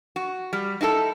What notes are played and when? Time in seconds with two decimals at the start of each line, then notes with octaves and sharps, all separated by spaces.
0.16 F#4
0.53 G3
0.81 D#4 E4 G#4 A4